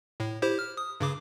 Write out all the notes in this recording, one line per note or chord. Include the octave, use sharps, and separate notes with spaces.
A2
E4 G4 C5
F6
D#6
G2 C#3 D6